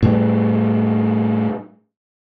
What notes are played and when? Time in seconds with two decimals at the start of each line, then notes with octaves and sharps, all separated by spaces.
0.03 A2 G3